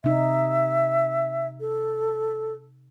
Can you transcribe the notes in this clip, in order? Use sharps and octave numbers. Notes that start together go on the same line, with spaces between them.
C3 D#4 E5
A4